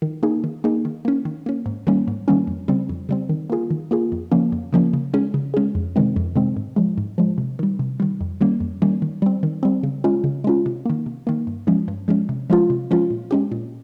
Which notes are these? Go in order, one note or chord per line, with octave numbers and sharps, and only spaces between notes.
D#3
A#3 D#4 G#4
D#3
A#3 D#4 G#4
D#3
A#3 C#4
D#3
A#3 C#4
G#2
D#3 G3 A#3 C#4
G#2
D#3 G3 A#3 C#4
F2
C#3 G3 C4
F2
C#3 G3 C4
D#3
A#3 F4 G#4
D#3
A#3 F4 G#4
F2
C#3 F3 A#3 C#4
F2
C#3 F3 A#3 C#4
C#3
G#3 C#4 G#4
C#3
G#3 C#4 G#4
F2
C3 D#3 G#3 C4
F2
C3 D#3 G#3 C4
G#2
F3 G#3
G#2
F3 G#3
C3
D#3 G3
C3
D#3 G3
F2
D#3 G3 A#3 C#4
F2
D#3 G3 A#3 C#4
D#3
G3 C4
D#3
G3 C4
C#3
G#3 C#4 F4
C#3
G#3 C#4 F4
C3
D#3 A#3
C3
D#3 A#3
G2
F3 G#3 C#4
G2
F3 G#3 C#4
C3
F3 G#3 C#4 F4
C3
F3 G#3 C#4 F4
A#2
G#3 C#4 G4
A#2